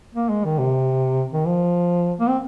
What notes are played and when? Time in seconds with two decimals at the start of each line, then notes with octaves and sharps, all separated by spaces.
0.14 A#3
0.29 G#3
0.44 D#3
0.58 C3
1.32 D#3
1.46 F3
2.19 A#3
2.29 C4